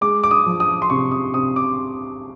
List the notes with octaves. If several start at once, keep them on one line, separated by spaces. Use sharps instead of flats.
G#3 D6
D6
D#6
F3
D#6
C6
C3 C#6
D#6
C3 D#6
D6